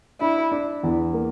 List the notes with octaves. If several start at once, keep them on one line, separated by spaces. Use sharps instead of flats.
D4 E4
D4
E2
A#3